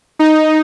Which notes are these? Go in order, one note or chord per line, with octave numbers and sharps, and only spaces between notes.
D#4